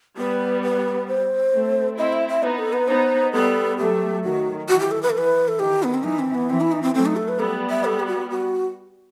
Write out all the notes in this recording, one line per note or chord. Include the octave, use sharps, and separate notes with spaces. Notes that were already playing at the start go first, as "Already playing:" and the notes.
G3 B3 B4
B4
C5
A3 C4
C4 E4 D#5
E5
E5
B3 D#4 B4
A4
B4
B3 D#4 C5
G3 B3 A4
F#3 A3 G4
D#3 F#3 F#4
E3 F#4
G4
A4
B4
A4
E3 B4
A4
D#3 G4
B3
C4
E3 D#4
C4
B3
E3 C4
E4
D#4
C4
F#3 A3 C4
D#4
A4
B4
G3 B3 A4
E5
A4
G4
F#4
F#4